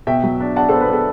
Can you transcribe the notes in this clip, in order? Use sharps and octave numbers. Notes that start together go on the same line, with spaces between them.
B2 E5 G5
F#3
D4
D4 F#5 A5
B3 A4 C5
B4
B3 A4